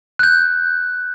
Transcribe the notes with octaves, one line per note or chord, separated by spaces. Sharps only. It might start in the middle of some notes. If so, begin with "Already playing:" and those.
F#6 G6